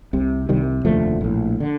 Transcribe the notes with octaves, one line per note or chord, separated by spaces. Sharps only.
C2 C3
C2 C3 D#3 G3
F1 D#2 D3 F3 A3
A#1 A2
D3